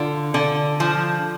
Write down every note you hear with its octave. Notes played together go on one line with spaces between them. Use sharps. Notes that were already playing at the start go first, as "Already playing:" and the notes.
Already playing: D3 F4
D3
F3